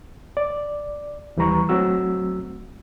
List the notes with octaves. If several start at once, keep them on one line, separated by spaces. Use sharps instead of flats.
D5
D#2 E3 G3 B4 A#5 C#6
F#3 A3 C4 F#4 E6